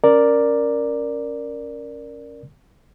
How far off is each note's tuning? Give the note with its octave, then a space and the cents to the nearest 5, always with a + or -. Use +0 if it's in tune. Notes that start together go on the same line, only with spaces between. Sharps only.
C#4 +0 A#4 +0 D5 +0